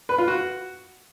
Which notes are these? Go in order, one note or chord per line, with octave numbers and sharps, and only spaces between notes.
B4
F4
F#4